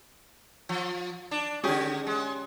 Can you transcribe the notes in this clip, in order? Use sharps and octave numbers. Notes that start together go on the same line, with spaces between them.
F3
D4
D3 C#4 G4 G#4
G#3